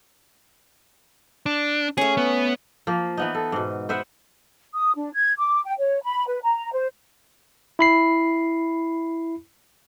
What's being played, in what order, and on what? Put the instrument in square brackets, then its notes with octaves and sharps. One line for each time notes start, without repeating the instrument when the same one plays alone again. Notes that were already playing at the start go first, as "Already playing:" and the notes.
[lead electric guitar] D4
[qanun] A3 C#4 [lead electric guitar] G#4
[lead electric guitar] B3
[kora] F3 A#3
E3 B3 D#4
A4
G#2 B2
B3 C5 E5 F#5
[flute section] D#6
D4
G#6
D6
G5
C#5
B5
B4
A#5
C5
[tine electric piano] E4 B5 C7